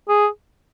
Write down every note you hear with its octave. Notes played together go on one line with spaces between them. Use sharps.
G#4